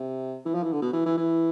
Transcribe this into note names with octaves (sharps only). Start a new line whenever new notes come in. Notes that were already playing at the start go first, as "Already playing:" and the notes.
Already playing: C3
E3
F3
E3
D3
B2
E3
E3
E3